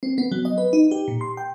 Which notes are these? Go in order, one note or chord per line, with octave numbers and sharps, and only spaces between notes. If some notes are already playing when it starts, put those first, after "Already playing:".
C4
B3
F#3
D#5
B4
D#4
G4
A#2
C6
G5